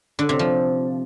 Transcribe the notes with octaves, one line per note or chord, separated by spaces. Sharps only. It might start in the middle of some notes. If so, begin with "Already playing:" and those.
D3
C3
F3